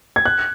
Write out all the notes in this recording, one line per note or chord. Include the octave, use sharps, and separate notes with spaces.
G#6
F#6